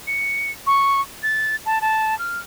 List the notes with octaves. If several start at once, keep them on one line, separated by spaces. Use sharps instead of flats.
C#7
C#6
A6
A5
A5
F6